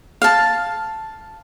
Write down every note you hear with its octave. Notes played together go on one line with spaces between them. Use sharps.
F5 A5